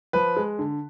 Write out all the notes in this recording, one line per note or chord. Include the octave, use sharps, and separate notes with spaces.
F3 B4
G#3
D3